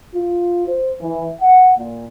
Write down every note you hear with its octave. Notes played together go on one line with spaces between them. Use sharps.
F4
C5
E3
F#5
A#2